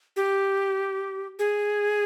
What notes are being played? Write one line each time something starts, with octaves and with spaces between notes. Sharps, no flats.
G4
G#4